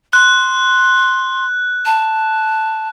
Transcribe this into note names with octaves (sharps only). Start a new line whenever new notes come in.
C6 F#6
A5